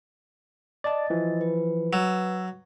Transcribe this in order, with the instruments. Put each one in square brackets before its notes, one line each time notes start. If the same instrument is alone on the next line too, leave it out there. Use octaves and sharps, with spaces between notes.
[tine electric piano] D5 A5 [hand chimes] D#5 A6
[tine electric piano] E3 F3
[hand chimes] B4
[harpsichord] F#3 [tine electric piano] E6